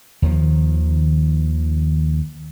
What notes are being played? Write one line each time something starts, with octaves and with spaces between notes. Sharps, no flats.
D#2 D#3 F3